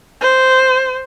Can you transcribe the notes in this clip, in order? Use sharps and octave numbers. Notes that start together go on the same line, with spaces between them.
C5